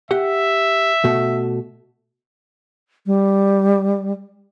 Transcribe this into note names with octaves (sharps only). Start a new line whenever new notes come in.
G4 E5 F#5
B2 A3 F#4
G3